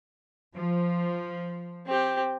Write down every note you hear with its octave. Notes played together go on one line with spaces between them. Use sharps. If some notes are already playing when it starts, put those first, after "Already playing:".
F3
C4 G4